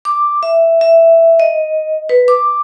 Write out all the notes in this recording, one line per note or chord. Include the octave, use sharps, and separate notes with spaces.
D6
E5
E5
D#5
B4
D6